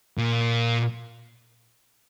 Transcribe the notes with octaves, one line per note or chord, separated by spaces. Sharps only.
A#2